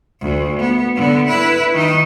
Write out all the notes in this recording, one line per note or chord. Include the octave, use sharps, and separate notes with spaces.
D2
B3
D3 B3
E4 B4
D#3 D#4